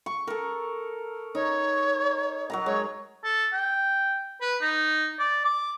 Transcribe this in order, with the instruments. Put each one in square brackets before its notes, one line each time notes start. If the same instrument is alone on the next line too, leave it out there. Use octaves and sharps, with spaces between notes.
[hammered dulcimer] C#6
A4 A#4
[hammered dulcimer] D#4 [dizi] C#5
[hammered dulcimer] F#3 A#4 A#5
[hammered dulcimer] G#3 [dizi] C#5
[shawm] A4
G5
B4
D#4
D5
D6